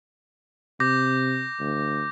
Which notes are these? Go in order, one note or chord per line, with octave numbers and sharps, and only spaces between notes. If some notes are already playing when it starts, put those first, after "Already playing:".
C3 D6 G6 A#6
D2